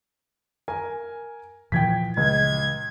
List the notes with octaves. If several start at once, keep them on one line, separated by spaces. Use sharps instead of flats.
A#4 G#5
A#2 E3 F3 G5 G#6 B6
C#2 G#6